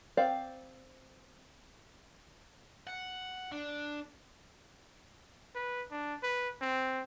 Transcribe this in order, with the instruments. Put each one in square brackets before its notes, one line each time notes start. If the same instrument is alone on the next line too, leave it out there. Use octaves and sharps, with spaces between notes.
[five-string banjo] C4 C5 D5 F5
[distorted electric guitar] F#5
D4
[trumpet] B4
D4
B4
C4